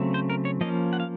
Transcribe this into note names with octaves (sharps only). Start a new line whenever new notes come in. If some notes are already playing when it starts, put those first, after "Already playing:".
Already playing: C#3 F#3 A3 C4
C5
A#4
C#5
F3 A#3 C#4 D#5
F#5
F5